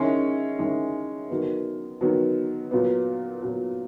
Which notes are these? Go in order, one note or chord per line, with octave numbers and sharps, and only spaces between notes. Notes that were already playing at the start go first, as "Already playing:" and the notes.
Already playing: D#3 G#3 C#4 E4
D#3 G#3 C#4 E4
D#3 F#3 B3
D#3 F#3 B3
A#2 F#3 B3
A#2 F#3 B3